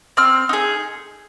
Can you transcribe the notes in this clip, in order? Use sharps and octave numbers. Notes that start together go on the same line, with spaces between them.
C4 F6
D#4 G#4